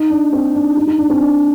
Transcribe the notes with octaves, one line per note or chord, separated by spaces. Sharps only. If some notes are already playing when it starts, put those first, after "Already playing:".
Already playing: D#4
D4
C4
D4
D#4
D#4
D4
C4
D4